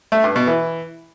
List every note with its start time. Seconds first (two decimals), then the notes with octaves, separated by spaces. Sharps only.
0.12 A3
0.24 G2
0.36 B2
0.47 E3